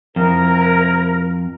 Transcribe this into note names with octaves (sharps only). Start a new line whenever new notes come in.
F2 C3 E4 A#4